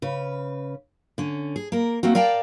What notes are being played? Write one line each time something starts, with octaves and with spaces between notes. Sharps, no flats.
C#3 B4
D3 C#4
G#4
A#3 A#4
A3 A#3 C4 F#4
A#4 D5 F5 G5 A5